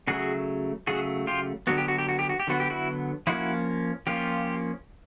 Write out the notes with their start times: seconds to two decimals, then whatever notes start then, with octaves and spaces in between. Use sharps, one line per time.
0.07 C#3 F#3 A3 F#4 G#4
0.87 C#3 F#3 A3 F#4 G#4
1.27 F4 G4
1.67 D3 F#3 B3 F#4
1.78 G4
1.88 F#4
1.98 G4
2.09 F#4
2.19 G4
2.29 F#4
2.40 G4
2.47 D3 F#3 B3 F#4
2.60 G4
2.70 E4 F#4
3.27 F3 A#3 C#4 E4 F#4
4.07 F3 A#3 C#4 F4 G4